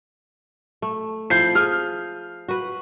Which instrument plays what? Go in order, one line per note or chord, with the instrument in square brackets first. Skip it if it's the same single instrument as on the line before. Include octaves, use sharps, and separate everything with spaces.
[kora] A3
[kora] F3 E4 [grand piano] G6 C7
[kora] G#4 [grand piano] F6
[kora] F#4 B4